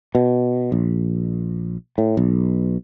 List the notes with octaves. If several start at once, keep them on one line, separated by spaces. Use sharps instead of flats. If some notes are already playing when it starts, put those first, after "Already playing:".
B2
A#1
A2
B1